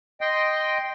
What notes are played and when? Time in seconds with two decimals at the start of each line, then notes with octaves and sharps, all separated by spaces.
0.21 D#5 G5 C6